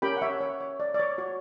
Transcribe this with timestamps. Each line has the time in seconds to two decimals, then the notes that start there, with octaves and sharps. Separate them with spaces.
0.02 C#4 G4 A#4 G5 B5
0.17 F#5
0.22 C#5 E5
0.41 C#5
0.61 C#5
0.80 D5
0.94 D5
1.00 C#5
1.18 F#4 C#5